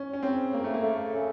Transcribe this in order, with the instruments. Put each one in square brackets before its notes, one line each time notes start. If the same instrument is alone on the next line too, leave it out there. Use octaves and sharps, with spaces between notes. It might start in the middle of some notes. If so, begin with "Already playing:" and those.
Already playing: [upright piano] C#4
C#4
[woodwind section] C#3 [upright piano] C4
[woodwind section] C#3 [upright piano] A#3
[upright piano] A3
A#3
[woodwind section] A3
C#3